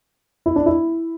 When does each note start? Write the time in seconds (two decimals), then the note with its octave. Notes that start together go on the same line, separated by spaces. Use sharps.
0.46 E4
0.56 D4
0.66 E4